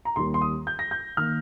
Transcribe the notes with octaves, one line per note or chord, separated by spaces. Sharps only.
A#5
D#2 D#3 G3 C6
C6
D#6
G6
A#6
G6
D#3 A#3 F6